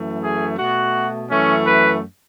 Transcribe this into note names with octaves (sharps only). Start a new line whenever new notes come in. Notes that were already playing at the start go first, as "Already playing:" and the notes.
Already playing: F#2 E3 A3
G#4
B2 A3 F#4
F#2 E3 A3 C#4
B4